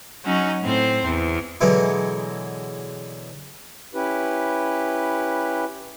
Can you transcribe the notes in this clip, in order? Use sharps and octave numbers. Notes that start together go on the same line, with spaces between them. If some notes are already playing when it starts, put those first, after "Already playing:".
F#3 C#4 D#4 F#4
A2 C4 C5
E2
B2 D3 E3 F#3 G#3
C#4 E4 G4 B4